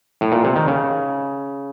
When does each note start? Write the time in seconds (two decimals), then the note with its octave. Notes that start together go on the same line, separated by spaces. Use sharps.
0.21 A2
0.32 A#2
0.44 C3
0.56 D#3
0.68 C#3